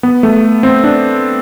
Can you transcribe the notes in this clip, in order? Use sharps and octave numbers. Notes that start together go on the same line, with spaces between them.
B3
A3
C4
D4